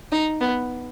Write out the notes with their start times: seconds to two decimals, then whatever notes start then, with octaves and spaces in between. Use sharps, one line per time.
0.12 D#4
0.41 B3